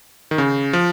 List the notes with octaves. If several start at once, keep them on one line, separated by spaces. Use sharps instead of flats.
D#3
C#3
F3